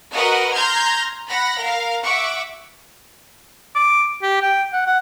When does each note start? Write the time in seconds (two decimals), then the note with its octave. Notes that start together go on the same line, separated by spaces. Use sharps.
0.14 F#4 A#4 B4 D#5 F#5
0.54 A#5 C6 F6 G6 G#6 A#6
1.28 F#5 B5 A#6
1.59 A#4 F5
2.03 E5 F#5 C#6 D6
3.75 D6
4.22 G4
4.42 G5
4.73 F#5
4.87 F#5